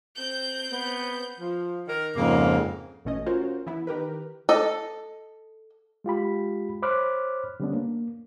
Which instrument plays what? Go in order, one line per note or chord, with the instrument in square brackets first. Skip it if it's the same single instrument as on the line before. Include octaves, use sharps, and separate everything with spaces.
[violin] C4 G6
[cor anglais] B3
[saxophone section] F3
D#3 A#4
[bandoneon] F2 G#2 C#3 [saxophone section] A#3
[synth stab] A1 B2 A3 C#4 D#5
C#4 F4 F#4 A#4 C5
E3 B3 E4
D#3 G4 A#4 B4
[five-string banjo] A4 D#5
[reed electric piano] G#3 F4 G4 B5
C5 C#5 B5 D6 F6 F#6
D3 G3 A3 B3 C#4 D4
A#3